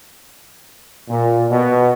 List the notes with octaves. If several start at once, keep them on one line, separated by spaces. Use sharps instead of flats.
A#2
B2